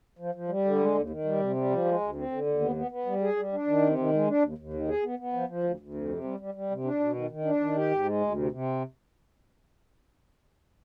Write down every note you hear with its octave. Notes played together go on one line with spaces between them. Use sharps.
F3
F3
G3
D3
G#3
D#2
D#3
G3
C3
G3
F3
G#3
D2
C4
D3
D#2
B3
B3
B3
G3
G#4
G3
D4
D#3
C3
D#3
G#3
D4
D#2
D#2
D#3
G#4
B3
B3
F3
F3
D2
D2
F2
C3
G3
G3
G3
C3
D4
B2
D#3
D#3
D4
D#3
G4
G#2
G#3
D2
C3
C3